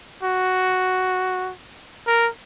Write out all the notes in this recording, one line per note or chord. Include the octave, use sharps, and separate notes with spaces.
F#4
A#4